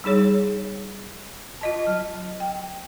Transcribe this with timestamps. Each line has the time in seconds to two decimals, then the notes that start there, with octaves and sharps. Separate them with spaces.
0.04 G3 D#4 G#4 C#5
1.61 F4 D#5 A5
1.87 F#3
2.40 G5